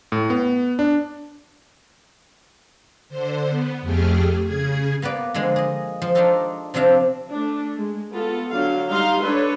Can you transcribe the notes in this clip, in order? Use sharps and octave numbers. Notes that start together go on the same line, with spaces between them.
A2
B3
D4
D3 C5
B3
F2 A3 G4 G#4 F6
C#3 G#4 G#6
A#3 B3 B4 D5
D3 F3 G#3 A#3
G#4 D#5
F3
D4 D#4 F4 G4 A4 A#4
C3 F3 C4 D4 E5 F5
A3 D4
G#3
B3 F4 A4
D3 F#3 F5
G3 D#4 F5 A#5 C6
D4 A4 B4 C#5